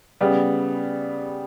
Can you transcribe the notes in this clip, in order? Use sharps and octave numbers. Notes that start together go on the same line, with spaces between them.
C#3 G3 B3